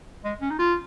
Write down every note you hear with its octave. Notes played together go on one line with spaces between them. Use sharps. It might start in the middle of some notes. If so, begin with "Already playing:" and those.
G#3
C#4
D#4
F4